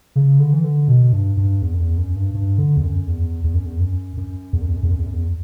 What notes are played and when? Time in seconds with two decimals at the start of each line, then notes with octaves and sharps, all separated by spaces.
0.16 C#3
0.39 D3
0.53 E3
0.64 D3
0.88 B2
1.13 G2
1.37 G2
1.62 E2
1.74 F#2
1.79 E2
1.98 F#2
2.16 G2
2.34 G2
2.58 D3
2.77 E2
2.83 F#2
3.07 E2
3.44 E2
3.55 F#2
3.65 E2
3.80 F#2
4.17 F#2
4.53 E2
4.61 F#2
4.68 E2
4.76 F#2
4.83 E2
4.91 F#2
4.99 E2
5.06 F#2
5.13 E2